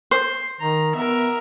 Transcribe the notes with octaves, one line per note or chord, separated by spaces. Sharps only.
C5
D#3 A#5
B3 A#4 E5